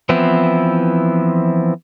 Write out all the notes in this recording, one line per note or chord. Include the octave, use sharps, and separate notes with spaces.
E3 F3 B3 C4 E4